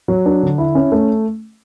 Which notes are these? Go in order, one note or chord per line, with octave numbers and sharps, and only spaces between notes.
F#3
D4
D3
E4
C#4
A3